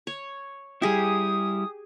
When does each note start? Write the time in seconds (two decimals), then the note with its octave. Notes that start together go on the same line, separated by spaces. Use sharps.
0.07 C#5
0.82 G3 E4 G4 G#4 D#6